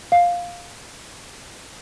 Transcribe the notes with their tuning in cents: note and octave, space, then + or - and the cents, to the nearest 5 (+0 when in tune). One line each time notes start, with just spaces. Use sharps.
F5 +5